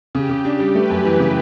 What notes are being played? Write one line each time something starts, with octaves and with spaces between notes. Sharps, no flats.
C#3 G4
C#3
D4
G3
A3 B4
F#2
E3
C#3